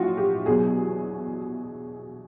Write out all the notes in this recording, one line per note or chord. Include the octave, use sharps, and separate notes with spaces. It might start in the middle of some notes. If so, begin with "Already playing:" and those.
Already playing: A#1 A2 F#3 F4 F#4
G4
E2 B2 F#3 G#4